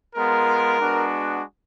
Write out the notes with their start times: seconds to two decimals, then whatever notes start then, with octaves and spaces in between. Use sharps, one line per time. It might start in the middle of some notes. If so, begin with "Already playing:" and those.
0.16 G#3 B3 F4 A#4
0.80 G#3 B3 D4 F#4